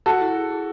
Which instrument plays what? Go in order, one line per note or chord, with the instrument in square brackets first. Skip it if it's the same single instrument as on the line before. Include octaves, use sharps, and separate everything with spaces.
[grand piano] F#4 A4 [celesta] F#5
[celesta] E4
G#4
G#4